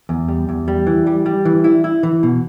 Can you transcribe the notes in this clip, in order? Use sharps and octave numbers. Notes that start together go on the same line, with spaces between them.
E2
G3
E2
G3
E3
G3
G3
E3
E4
E4
E3
B2